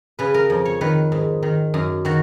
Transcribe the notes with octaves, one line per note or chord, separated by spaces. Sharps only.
C#3 B4
A#4
F2
C#5
D#3 B4
G#2
D#3
F#2
D#3 F#4